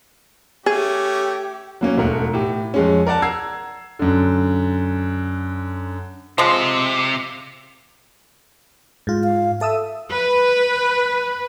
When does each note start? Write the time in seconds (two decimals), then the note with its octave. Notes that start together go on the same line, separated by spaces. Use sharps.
0.66 A3 C#4 G4 G#4
1.81 F#3 A#3 C#4
1.97 E1 G#2 A3 A#4 F#5
2.33 A2 G4
2.74 F2 G#3 C#4
3.06 A#4 D5 F#5 A5
3.22 F#5 A#5 E6 G#6 C7
3.99 F#2 D3
6.38 C3 F3 G#3
9.07 G#2 F4
9.24 F5
9.61 A4 E5 D#6 E6
10.11 B4